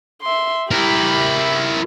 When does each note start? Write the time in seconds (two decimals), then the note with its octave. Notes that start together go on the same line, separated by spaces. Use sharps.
0.22 E5 C6
0.71 E4 G4 A#4 B5